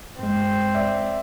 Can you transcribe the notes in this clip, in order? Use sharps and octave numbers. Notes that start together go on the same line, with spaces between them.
G2 G#3 C4
D5 E5